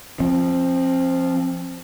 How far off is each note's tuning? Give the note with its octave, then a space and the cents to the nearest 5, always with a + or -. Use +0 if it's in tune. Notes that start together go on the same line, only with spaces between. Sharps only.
F3 +0 C4 +30